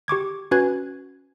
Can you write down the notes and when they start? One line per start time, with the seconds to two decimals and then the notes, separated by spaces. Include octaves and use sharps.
0.08 G4 C#6 D6 G#6
0.51 C#4 F#4 B4 G#5 F#6 G#6